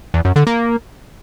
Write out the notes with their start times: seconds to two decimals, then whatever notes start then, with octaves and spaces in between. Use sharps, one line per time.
0.14 E2
0.25 F#2
0.36 D3
0.47 A#3